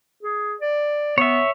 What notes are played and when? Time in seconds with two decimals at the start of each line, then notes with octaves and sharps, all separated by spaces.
0.23 G#4
0.61 D5
1.18 B3 C#5 E5